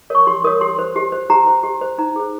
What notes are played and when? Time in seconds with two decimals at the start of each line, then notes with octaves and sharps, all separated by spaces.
0.10 A#4 C#5 C#6
0.27 G4 C6
0.44 A#4 C#5 D#6
0.61 G4 C6
0.79 C5
0.96 G4
1.12 C5
1.30 G4 A#5
1.47 C5
1.64 G4
1.81 C5
1.98 D#4 A#5
2.16 G#4 C5